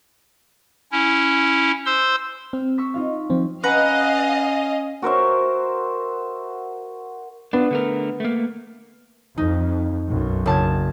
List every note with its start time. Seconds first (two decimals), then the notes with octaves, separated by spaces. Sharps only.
0.92 C#4 E4
1.86 C5 C6 E6
2.53 C4 F6
2.78 C#6 E6 B6
2.94 D#4 F4 F5
3.30 F3 C4
3.64 C#4 B4 D#5 F5 F#5 A#5
5.02 F#4 A#4 C5 E5
7.53 B3 D4 F4
7.71 D3 A3 A#4
8.20 A3 A#3
9.38 F2 D#4
10.08 B1 F#2
10.46 F#1 A5 G#6